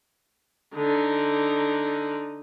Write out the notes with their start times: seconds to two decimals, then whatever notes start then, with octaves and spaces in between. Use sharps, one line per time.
0.75 D3 D#4